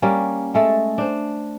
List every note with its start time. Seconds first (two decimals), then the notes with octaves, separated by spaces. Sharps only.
0.02 G3 A#3 C#4
0.54 G#3 A3 A4
0.98 D4 C5